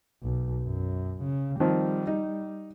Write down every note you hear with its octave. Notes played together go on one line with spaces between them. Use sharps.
B1
F#2
C#3
D#3 F3 G3 C4
D#4